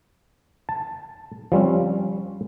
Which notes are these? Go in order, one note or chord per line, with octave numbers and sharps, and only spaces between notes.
A5
F3 G3 C4 C#4